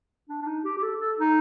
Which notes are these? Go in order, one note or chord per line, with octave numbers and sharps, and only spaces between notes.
D4
D4
D#4
G4
G4
A4
A4
D#4